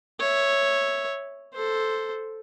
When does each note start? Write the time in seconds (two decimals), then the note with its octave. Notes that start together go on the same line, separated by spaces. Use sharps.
0.20 C#5 E5
1.53 A4 C5